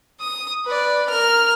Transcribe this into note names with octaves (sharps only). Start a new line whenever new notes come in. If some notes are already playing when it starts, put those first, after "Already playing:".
D#6
B4 D5
A#4 F6